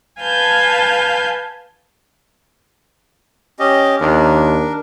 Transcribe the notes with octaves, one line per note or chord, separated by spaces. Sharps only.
B4 F5 G#5 A5 G6
C#4 G4 D#5
D#2 D4 A#4